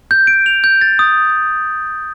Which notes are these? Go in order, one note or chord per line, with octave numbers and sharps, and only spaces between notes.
G6
D7
F7
G6
A6
D#6